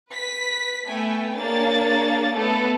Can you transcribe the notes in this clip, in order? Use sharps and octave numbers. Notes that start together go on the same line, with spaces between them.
B4 B6
A3 B3 G5 G#5
A#3 D4 G#4 C#5 A6
A3 B3 A4